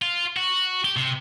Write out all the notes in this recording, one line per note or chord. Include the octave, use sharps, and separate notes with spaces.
F4
F#4
G4
C3